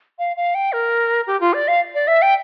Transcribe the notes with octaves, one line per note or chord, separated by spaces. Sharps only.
F5
F5
G5
A#4
G4
F4
D5
F5
D5
E5
G5